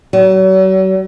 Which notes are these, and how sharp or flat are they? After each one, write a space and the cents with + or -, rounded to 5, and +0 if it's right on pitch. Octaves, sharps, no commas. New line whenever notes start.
F#3 +40